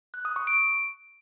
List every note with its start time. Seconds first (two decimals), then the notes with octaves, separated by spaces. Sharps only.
0.14 F#6
0.25 D#6
0.36 C#6
0.47 D7